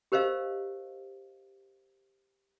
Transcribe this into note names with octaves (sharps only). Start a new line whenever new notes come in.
G4 A#4 C5 D#5 F5